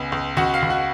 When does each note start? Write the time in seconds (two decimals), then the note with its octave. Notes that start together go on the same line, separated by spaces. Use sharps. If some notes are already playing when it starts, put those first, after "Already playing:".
Already playing: C#2 B3 G#5
0.12 C#2
0.37 C#2 F#4 F#5
0.54 F5
0.62 C#2
0.70 F#4 F#5